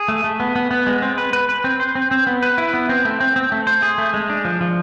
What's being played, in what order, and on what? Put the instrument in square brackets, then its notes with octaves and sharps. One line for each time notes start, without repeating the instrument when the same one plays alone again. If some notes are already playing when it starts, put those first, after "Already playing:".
Already playing: [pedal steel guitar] G#4
A3
A3
B3
B3
B3
G#3
C4
B4
B4
B4
C4
C5
C4
C4
B3
B4
E4
B3
C4
A3
C4
C4
A3
C5
G#4
A3
G#3
D4
F3
F3